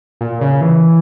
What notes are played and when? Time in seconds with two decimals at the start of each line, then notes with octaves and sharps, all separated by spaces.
0.21 A#2
0.41 C#3
0.61 E3